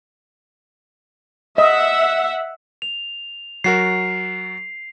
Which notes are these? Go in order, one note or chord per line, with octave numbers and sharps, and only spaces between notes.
D#5 E5 F#5
F7
F#3 F#4 A#4 C7